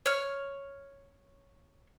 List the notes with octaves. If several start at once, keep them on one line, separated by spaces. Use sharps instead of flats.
C#5 F6